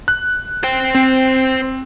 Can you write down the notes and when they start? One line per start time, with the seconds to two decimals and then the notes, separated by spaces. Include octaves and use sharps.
0.08 F#6
0.64 C5 G5
0.95 C4